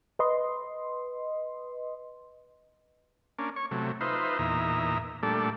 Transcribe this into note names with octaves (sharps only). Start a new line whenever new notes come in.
B4 D#5 C6
A#3 C#4 D4
C#5 C#6
C3 F#3 A3
D#4 F4 B4 C5 E5
E2 A#2 D#4 E5 A#5
A#2 G3 A3 D4 A4